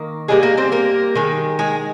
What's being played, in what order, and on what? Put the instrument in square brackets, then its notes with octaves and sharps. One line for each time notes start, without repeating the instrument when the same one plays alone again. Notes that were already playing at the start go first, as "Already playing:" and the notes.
Already playing: [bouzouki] D#3 A#3
D3 G3 G#3 A#3 G#4
A#3 A#4
C4 C5
A#3 A#4
D#3 G#3
G#3 G#4